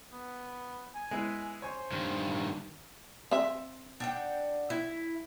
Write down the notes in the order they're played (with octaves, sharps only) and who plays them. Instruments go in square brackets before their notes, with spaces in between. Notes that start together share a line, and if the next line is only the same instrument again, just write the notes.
[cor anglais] B3
G#5
[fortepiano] G#3 B3 E4
[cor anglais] C5 [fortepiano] C#5 G#5 C#6
[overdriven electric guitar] G2 D#3
[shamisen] C4 E5
[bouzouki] D4 F#5 G5
E4